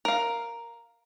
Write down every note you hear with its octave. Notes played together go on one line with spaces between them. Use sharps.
A#4 F5